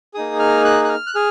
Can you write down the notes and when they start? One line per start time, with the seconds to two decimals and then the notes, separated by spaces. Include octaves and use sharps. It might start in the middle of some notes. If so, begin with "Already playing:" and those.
0.14 A#3 D#4 G#4 D#6
0.39 F6
0.65 F#6
0.85 F#6
0.89 F6
1.07 F#6
1.15 G#4 F6